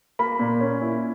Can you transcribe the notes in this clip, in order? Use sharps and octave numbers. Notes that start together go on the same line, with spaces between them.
A#3 B5
A#2
C#4
E4